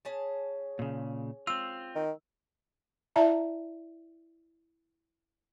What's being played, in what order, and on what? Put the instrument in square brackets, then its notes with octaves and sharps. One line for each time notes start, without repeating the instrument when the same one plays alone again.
[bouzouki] C#4 G#4 A5
[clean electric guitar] A#2 C#3
[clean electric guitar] C4 F4 [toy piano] E6
[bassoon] D#3
[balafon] E4 D5 E5 A5 A#5